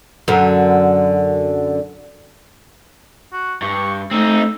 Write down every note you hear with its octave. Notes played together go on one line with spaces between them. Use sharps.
F#2 D3
F#4
G2 C#6
A3 C4 D#4 E6